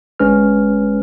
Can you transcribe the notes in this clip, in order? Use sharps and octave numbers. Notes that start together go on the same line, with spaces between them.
G1 G#3 C#4 B4 F6